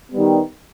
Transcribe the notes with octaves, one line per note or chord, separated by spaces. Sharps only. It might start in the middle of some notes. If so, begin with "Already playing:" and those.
D#3 G3 B3